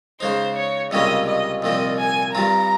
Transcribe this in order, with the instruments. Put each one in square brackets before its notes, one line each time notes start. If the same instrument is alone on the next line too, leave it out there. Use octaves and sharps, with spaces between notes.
[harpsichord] C#3 G#3 D#4 [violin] C5
[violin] C#5
[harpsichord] C#2 C3 G3 A#3 C#4 [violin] D#5
[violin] D#5
[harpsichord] C2 A#2 F3 C4 [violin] D#5
[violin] G#5
[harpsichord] G2 G3 C4 F4 [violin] A#5